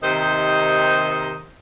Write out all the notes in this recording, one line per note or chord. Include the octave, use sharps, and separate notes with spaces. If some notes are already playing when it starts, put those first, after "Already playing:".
D#2 C3 D#3 D#4 C5 D#5